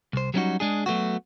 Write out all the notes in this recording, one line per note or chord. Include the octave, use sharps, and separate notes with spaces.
C2 C5
F#3 G3 B3 C#4 D#4 F#4
G#3 D4 G#4
F#3 A3 B3 F#4